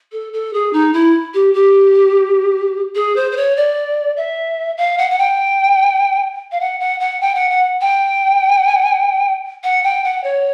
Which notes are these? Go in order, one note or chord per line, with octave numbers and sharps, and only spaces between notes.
A4
A4
G#4
D#4
E4
G4
G4
G#4
C5
C5
C#5
D5
E5
F5
F#5
F#5
G5
F5
F#5
F#5
F#5
G5
F#5
F#5
G5
F#5
G5
F#5
C#5